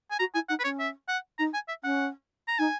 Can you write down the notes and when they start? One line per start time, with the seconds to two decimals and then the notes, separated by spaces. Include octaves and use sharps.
0.11 G#5
0.19 F#4 A#5
0.34 E4 G#5
0.49 D#4 F#5
0.59 B4
0.64 C#4 C#5
0.79 E5
1.08 F#5
1.38 D#4 A#5
1.54 G#5
1.68 E5
1.84 C#4 F#5
2.48 A#5
2.59 D#4 G#5